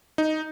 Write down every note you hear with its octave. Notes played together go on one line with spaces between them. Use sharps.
D#4